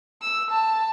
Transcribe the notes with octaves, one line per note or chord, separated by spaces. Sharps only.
E6
A5